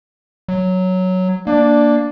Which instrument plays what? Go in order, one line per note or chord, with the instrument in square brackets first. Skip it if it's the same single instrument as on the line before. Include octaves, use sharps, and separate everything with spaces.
[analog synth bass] F#3
[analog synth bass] A#3 [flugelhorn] D4